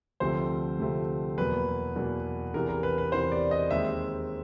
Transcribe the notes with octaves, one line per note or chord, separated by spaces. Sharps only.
D2 C3 F3 A3 C4 C5
D2 C3 F3 A3 C4
E2 B2 F#3 A#3 B4
E2 B2 F#3 A#3
E2 C3 E3 A#4
A#4
B4
B4
E2 C3 E3 C5
D5
D#5
D#2 D#3 G#3 C4 E5